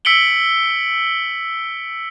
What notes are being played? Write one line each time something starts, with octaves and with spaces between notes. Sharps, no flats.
E6 B6 C#7 D7 F#7 G7